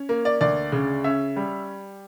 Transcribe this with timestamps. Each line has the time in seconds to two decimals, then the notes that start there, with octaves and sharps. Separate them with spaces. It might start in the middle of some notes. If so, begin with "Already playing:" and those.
Already playing: C#4
0.09 A#3
0.25 D5
0.41 D2 D5
0.72 C#3
1.04 C#4 E5
1.36 G3